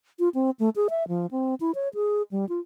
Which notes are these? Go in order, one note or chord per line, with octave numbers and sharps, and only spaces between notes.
F4
C4
A3
G#4
E5
F3
C4
E4
C#5
G#4
G3
F4